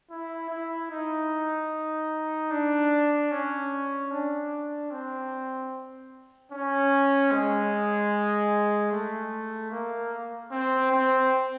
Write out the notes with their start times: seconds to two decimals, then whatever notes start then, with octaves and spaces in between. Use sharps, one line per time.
0.10 E4
0.50 E4
0.91 D#4
2.51 D4
3.31 C#4
4.11 D4
4.91 C4
6.52 C#4
7.31 G#3
8.92 A3
9.71 A#3
10.52 C4
10.91 C4